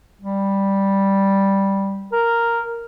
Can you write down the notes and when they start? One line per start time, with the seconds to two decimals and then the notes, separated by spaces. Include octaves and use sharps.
0.22 G3
2.12 A#4